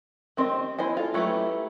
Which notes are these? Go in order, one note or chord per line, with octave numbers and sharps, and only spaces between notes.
D#3 C4 G4 D#5
B3 E4 C5 D#5 G#5
F4 A4
F#3 A3 E4 G4 B4